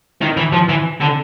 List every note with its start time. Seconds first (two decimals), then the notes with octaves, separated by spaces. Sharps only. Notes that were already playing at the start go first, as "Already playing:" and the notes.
0.22 D#3
0.37 E3
0.53 F3
0.69 E3
1.00 D3